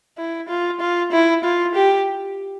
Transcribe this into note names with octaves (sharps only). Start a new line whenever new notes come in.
E4
F4
F4
E4
F4
G4